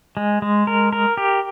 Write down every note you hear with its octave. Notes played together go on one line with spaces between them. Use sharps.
G#3
G#3
A#4
A#4
G4